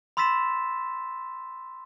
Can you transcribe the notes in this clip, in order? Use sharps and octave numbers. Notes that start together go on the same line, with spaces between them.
B5 C6 E6 A6 B6 E7